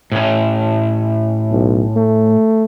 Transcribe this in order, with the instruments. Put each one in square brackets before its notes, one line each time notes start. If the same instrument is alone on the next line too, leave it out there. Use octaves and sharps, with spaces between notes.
[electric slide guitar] A2 C#4
[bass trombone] B1
A3